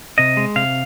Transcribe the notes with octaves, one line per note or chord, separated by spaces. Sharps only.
C3 D#5
G#3
C3 F5